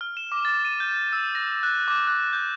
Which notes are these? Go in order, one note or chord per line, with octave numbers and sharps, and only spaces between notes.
F6
E7
D6
A6
D#7
G6
E6
A#6
F#6
D6
F#6
G6